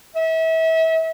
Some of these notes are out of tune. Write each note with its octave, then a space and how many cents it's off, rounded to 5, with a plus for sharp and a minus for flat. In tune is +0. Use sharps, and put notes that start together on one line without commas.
E5 -35